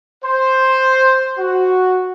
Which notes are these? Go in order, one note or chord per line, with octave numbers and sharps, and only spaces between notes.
C5
F#4